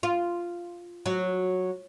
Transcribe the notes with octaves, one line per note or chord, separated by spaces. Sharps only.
F4
F#3